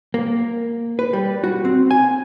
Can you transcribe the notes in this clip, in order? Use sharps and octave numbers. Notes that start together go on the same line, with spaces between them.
A#3
B4
G3
F#4
C4
G#5